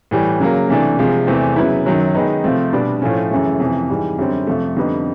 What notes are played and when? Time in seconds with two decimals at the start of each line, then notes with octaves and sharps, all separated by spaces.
0.11 A2 E3 G3
0.40 C#3 F#3 A#3
0.69 C3 E3 A3 D4
0.99 C3 F3 G#3
1.27 E2 C3 E3 A3 C4
1.56 C#3 F#3 B3 E4
1.86 F#2 D#3 F#3
2.14 D#3 G#3 B3 D#4
2.44 C3 F3 A3 C4
2.73 B2 G3 B3 D4
3.02 A2 F3 A3 C#4
3.31 F#2 C#3 E3 A3
3.60 F2 C3 E3
3.90 G#2 E3 G3
4.19 F#2 D3 G3 C4
4.47 F2 C3 F3 A3
4.76 F2 D3 G3 B3 D#4